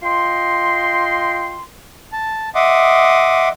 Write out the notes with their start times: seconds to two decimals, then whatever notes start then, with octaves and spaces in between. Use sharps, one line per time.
0.03 F4 D#5 G5 C6
2.12 A5
2.55 D#5 E5 F#5 C6 D6 D#6